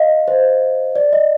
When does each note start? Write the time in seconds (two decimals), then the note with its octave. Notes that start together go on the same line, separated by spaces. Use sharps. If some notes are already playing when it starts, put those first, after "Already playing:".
Already playing: D#5 F5
0.28 C5
0.96 D5
1.13 D#5